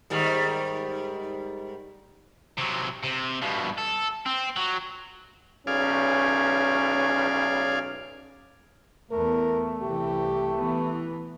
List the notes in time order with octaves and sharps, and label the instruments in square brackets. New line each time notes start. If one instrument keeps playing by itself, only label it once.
[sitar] G#2 D#3 G3
[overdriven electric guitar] C3 F#3
C3
G2 B2
A4
C4
F#3
[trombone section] B1 C#4 [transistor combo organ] G#4 D5 F5
[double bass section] E2 B3 [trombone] A3 [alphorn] A#4
[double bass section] C2 E3 [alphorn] G4
[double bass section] E3 B3